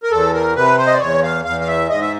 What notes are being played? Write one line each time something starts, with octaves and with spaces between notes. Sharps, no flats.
A#4
E2 A4
A#4
C3 B4
C5
D#5
D5
E2 C#5
F5
E2 F5
F5
E5
G#2 D#5
E5